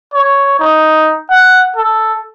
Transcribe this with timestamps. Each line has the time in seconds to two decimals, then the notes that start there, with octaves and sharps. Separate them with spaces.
0.14 C#5
0.59 D#4
1.30 F#5
1.76 A4